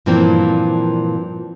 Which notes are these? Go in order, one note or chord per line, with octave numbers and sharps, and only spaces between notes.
G2 A#2 E3 F3 A#3 C4